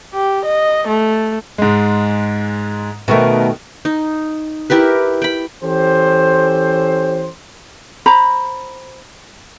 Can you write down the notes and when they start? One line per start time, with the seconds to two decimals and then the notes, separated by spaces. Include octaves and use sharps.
0.13 G4
0.45 D#5
0.88 A3
1.58 G#2 G#3
3.08 B2 D#3 A3 B3 A4 A#4
3.85 D#4
4.70 E4 G4 A#4 B4
5.22 G5 B5
5.63 E3 C#4 G4 A4 C5
8.06 C5 A#5 B5